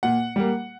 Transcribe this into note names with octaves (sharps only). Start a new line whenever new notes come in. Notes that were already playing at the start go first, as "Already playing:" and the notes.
A#2 F#5
G3 A#3